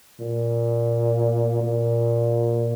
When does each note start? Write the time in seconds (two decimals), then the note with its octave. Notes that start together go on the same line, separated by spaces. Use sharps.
0.20 A#2
1.63 A#2